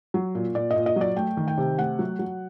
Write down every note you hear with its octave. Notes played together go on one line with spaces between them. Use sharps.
F#3
A#2
A#2 D5
D#5
A#2
D#5
F#3 D5
A3 G5
D#3
G5
C3
A3 F#5
F#3
F#3